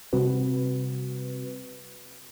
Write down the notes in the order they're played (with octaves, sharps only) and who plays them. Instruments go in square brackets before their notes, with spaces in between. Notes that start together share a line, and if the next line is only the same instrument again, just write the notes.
[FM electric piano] C3 G3 C4 F#4 B4